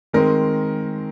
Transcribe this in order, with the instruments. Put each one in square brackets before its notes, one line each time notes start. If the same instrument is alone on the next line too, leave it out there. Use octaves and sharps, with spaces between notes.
[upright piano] D#3 G#3 C4 A#4